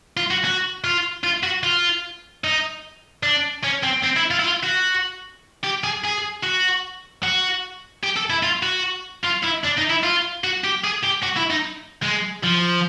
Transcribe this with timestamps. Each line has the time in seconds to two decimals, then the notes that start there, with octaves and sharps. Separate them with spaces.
0.17 F4
0.31 F#4
0.45 F#4
0.84 F4
1.24 F4
1.43 F#4
1.63 F4
2.44 D#4
3.23 D4
3.64 C#4
3.84 C4
4.04 C4
4.17 E4
4.31 F4
4.39 E4
4.44 F4
4.63 F#4
5.64 G4
5.84 G#4
6.04 G#4
6.43 F#4
7.23 F#4
8.03 G4
8.16 A4
8.30 E4
8.43 F4
8.63 F#4
9.24 F4
9.43 E4
9.64 D4
9.77 D#4
9.89 E4
10.03 F4
10.44 F#4
10.64 G4
10.84 G#4
11.03 G4
11.23 F#4
11.37 E4
11.50 D#4
12.03 G#3
12.43 F3